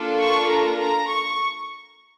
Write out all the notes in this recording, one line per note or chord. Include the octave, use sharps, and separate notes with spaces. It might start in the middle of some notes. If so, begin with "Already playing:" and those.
Already playing: A#3 D4 F4 A4
C#6
A#5
A#5
C#6